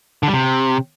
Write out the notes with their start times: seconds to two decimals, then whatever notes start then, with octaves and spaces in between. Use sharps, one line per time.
0.23 D3
0.28 G3
0.33 C3